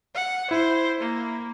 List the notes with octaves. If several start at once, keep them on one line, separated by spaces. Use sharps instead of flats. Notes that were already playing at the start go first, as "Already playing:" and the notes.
F#5
E4 C5
A#3